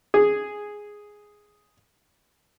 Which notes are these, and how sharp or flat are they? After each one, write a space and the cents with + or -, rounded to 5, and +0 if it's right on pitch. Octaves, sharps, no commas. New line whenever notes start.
G#4 +0